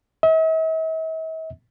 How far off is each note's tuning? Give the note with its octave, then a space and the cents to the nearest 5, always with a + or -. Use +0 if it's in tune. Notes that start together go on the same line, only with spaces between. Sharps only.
E5 -45